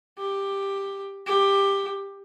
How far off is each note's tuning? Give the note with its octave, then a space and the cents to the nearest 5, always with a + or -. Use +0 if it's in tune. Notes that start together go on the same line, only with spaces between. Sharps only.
G4 +10
G4 +10